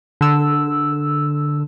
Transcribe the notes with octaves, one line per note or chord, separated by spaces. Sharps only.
D3 E6